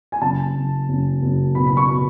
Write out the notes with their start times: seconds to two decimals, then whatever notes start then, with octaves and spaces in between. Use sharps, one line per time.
0.12 G#5
0.21 F#1 A5
0.55 F#1
0.89 F#1
1.22 F#1
1.55 B2 B5
1.67 B5
1.77 C#6
1.88 B2